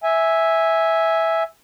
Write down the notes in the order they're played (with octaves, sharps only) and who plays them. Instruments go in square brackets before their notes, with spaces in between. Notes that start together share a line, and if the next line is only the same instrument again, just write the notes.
[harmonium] E5 G#5